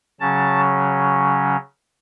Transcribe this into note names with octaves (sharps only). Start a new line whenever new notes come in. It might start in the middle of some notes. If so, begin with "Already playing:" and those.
C#3 F#3 C#4 A5